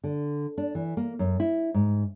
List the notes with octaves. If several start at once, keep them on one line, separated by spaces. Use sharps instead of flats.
D3
D4
E3
A#3
F#2
E4
G#2